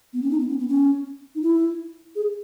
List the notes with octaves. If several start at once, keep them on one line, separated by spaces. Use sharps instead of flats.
B3
C#4
D#4
B3
C#4
B3
C#4
D#4
E4
G#4